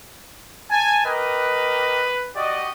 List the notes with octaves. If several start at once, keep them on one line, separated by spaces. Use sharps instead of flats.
G#5 A5
G4 A#4 B4 D#5
F#4 G4 D5 D#5